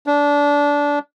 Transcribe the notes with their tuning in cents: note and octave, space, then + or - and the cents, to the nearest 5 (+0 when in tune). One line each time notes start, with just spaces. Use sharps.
D4 -20